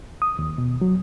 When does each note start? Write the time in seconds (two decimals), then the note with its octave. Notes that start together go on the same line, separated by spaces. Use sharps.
0.22 D#6
0.39 D#2
0.58 B2
0.81 F#3